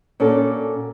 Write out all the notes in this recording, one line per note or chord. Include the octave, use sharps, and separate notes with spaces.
A#2 C#4 D4 F#4 A4